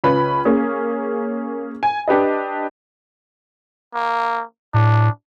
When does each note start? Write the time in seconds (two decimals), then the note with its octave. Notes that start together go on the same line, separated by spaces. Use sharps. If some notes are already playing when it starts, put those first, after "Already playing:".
0.04 C#2 C#4 F4 B4 B5
0.45 A#3 C#4 G#4
1.83 G#5
2.08 D4 G4 B4 D#5
3.95 A#3
4.74 A2 D4